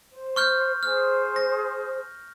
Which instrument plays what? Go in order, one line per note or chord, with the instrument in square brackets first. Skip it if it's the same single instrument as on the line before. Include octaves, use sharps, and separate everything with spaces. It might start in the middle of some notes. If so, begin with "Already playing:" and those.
[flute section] C5
[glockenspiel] C#6 F6 G6
[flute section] G#4 C5 [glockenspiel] F6
[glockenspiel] A#6